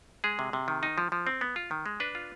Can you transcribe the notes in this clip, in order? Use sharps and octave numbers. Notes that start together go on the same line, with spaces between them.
G#3 G#4
C3
C3
D#3
D#4
F3
F3
C4
B3
F4
D#3
G#3
D4 B4
F4